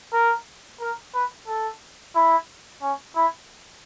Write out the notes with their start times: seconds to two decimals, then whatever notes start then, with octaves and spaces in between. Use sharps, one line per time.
0.13 A#4
0.81 A#4
1.14 B4
1.48 A4
2.16 E4
2.83 C#4
3.16 E4